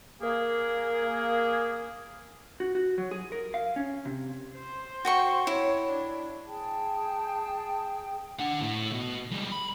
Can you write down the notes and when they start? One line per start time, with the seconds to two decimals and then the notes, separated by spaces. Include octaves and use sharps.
0.21 A#3 G#4
2.60 F#4
2.75 F#4
2.98 F#3
3.11 G#4
3.32 A#4
3.54 F5
3.76 C#4
4.05 C3
4.56 C5
5.05 F#4 G5 C#6
5.47 E4 C#5
5.91 D4
6.47 G#4 G5 A5
8.39 D4 F#5
8.61 A2
8.92 B2
9.31 G3 G#3
9.52 B5